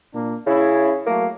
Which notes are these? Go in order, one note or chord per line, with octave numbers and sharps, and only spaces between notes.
A#2 A#3 D4
C#3 C#4 E4
F#3 A3 A#3